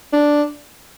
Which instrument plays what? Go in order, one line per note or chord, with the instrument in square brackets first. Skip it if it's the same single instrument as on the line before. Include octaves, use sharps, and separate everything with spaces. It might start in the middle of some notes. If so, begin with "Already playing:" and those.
[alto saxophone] D4